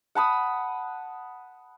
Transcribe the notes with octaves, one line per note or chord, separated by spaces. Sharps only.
F#5 A5 B5 D#6